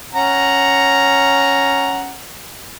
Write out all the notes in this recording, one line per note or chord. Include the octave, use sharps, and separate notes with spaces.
C#4 F#5 A#5